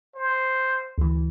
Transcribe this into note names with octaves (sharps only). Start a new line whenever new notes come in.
C5
D2 E3